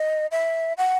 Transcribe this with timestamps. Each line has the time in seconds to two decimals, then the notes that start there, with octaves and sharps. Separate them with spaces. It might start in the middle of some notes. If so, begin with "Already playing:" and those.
Already playing: D#5
0.31 E5
0.78 F#5